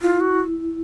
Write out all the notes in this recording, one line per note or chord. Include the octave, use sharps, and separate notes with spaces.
E4 F4
F#4